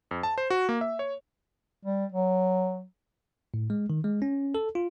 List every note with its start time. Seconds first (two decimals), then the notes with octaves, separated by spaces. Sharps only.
0.11 F2
0.23 A5
0.38 C5
0.50 F#4
0.69 A#3
0.81 E5
0.99 C#5
1.85 G3
2.12 F#3
3.54 A2
3.70 G#3
3.90 D#3
4.04 G#3
4.22 C#4
4.55 A4
4.75 F4